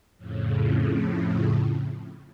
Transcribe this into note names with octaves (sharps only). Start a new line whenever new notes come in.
F2 A2 C#3